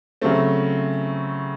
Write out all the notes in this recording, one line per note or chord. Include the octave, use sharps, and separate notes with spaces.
C#3 F#3 A3 C4